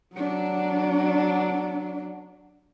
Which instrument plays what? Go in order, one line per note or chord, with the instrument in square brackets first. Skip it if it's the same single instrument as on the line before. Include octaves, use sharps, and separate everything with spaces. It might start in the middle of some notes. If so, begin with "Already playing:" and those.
[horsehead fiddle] F#3 D4